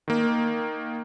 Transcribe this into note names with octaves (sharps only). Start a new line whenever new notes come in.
D#3 A#3